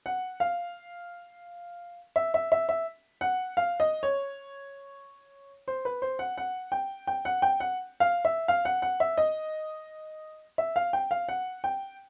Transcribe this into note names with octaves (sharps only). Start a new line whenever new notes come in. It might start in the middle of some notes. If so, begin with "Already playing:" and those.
F#5
F5
E5
E5
E5
E5
F#5
F5
D#5
C#5
C5
B4
C5
F#5
F#5
G5
G5
F#5
G5
F#5
F5
E5
F5
F#5
F#5
E5
D#5
E5
F5
G5
F5
F#5
G5